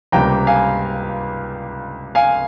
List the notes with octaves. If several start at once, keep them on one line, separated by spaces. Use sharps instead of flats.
C#2 C3 G3 A#3 G5 A#5
F5 G#5
F5 G#5